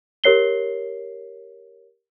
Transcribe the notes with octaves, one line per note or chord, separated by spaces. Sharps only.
G4 A#4 C#5 C7 G7